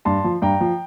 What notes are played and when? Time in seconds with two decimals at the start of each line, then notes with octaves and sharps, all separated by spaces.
0.05 G2 A5 C6
0.24 F3
0.42 G2 G5 A#5
0.61 F3